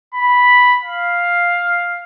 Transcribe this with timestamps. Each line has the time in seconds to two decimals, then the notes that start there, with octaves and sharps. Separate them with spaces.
0.14 B5
0.82 F5